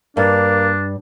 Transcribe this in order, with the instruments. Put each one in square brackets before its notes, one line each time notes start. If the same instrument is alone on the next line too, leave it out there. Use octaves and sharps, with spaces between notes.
[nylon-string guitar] G2 [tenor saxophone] A#3 [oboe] D4